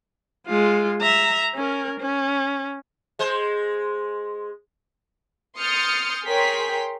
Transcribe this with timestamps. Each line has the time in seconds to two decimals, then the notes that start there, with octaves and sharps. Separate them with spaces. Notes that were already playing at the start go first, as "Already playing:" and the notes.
0.47 G#3 F4
1.01 E5 A#5
1.55 C#4 A#4
2.00 C#4
3.19 G#3 C5
5.59 C6 D#6 F6 G6 A6 C#7
6.26 G#4 A#4 C#5 G5 C6 B6